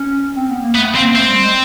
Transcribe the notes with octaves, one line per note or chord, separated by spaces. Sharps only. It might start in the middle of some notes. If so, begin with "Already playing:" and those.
Already playing: C#4
C4
B3
A#3
A3 B3
A#3 C4
A3 C4
G3
G#3